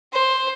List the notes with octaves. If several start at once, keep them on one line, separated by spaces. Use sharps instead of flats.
C5